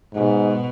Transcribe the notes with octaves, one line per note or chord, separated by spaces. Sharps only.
G#2 B2